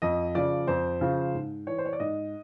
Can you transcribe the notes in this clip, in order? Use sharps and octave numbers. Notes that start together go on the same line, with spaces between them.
F2 D#5
C#3 F3 D5
F2 C5
C#3 F3
G#2
E3 C#5
C5
C#5
D5
G#2 D#5